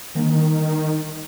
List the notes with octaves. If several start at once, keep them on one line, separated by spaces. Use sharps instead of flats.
D3 D#3 G3 A#3 D4